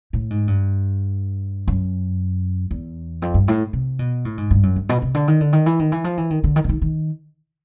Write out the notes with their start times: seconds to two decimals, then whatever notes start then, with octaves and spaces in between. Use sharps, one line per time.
0.13 A2
0.30 G#2
0.47 G2
1.68 F#2
2.71 E2
3.22 F2
3.34 G2
3.48 A2
3.73 C3
3.99 B2
4.25 A2
4.38 G#2
4.51 G2
4.63 F#2
4.76 G2
4.89 B2
5.02 C3
5.14 D3
5.28 D#3
5.41 D3
5.53 D#3
5.66 E3
5.79 D#3
5.92 E3
6.04 F3
6.17 E3
6.30 D#3
6.44 D3
6.56 D#3
6.64 D3
6.69 D#3
6.82 D#3